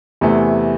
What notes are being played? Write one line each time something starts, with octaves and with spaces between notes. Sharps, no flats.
E2 C3 E3 A3